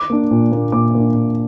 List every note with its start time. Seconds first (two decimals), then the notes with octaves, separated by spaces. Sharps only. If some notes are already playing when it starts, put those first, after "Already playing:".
Already playing: D6
0.10 A#3 D4
0.31 A#2
0.52 A#3 D4
0.72 A#2 D6
0.95 A#3 D4
1.15 A#2